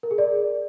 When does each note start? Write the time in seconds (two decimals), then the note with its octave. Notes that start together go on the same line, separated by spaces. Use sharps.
0.03 A#4
0.11 G#4
0.18 D5